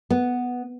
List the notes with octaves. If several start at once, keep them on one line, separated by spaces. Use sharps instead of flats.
B3